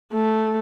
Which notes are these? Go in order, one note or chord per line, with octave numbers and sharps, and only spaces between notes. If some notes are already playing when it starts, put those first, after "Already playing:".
A3